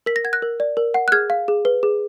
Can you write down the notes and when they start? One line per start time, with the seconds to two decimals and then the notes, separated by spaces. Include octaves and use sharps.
0.06 A#4 B6
0.16 A#6
0.24 F#5 G#6
0.33 F#6 A#6
0.42 A#4
0.60 D5
0.77 A#4
0.94 F#5
1.08 F#6
1.12 G#4 F6 G#6
1.30 F5
1.48 G#4
1.65 B4
1.83 G#4